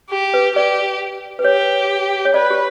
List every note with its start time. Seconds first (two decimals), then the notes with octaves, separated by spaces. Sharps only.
0.11 G4
0.34 B4
0.56 G4 D5
1.39 B4
1.44 G4 C#5
2.25 C#5
2.34 B4 D5
2.50 G4